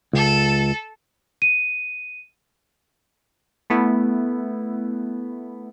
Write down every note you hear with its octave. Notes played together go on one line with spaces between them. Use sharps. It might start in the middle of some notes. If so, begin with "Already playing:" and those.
C#2 A4
D#7
A3 B3 E4